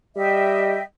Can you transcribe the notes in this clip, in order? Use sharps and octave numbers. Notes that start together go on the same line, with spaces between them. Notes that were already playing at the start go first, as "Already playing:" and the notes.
G3 D#5 E5 G5